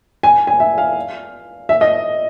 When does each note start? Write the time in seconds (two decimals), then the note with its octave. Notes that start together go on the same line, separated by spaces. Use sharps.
0.23 G#5
0.47 G#5
0.60 E5
0.78 F5
1.69 E5
1.81 D#5